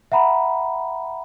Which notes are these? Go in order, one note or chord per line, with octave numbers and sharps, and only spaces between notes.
E5 F#5 A#5 B5